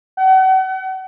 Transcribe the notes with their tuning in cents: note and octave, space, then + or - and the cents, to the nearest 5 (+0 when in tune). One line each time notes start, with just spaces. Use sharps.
F#5 +40